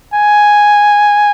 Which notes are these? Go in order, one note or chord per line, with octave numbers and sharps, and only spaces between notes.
G#5